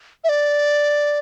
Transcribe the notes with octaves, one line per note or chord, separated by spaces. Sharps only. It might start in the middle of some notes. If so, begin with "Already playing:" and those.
E5
D5